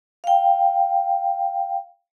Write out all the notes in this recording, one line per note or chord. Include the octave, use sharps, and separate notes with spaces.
F5 G5